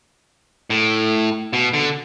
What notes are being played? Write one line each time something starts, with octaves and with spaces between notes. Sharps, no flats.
A2
B2
D3